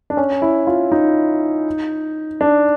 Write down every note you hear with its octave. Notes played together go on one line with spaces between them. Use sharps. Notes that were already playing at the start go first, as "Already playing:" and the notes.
D4
C#4
E4
F4
D#4
D4